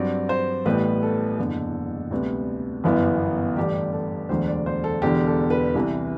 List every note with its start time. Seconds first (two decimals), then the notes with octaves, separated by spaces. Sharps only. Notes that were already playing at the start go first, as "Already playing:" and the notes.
Already playing: G2 F#3 C4 D5
0.29 C5
0.65 A1 A2 G3 B3 B4
1.03 A4
1.38 F#1 E2 D3 A4
2.11 D2 C3 G3 B3
2.84 G1 F#2 E3 B3 E4
3.56 A1 G2 D3 G3 D4 G4
3.93 A4
4.29 E1 D2 D3 F#3 C5
4.47 D5
4.66 C5
4.84 A4
5.02 E1 E2 D3 G4
5.27 A4
5.50 B4
5.75 C2 C3 E3 B4